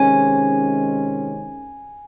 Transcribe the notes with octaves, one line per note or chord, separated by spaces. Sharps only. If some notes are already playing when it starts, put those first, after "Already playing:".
Already playing: C3 D#3 G#3 C#4 G#5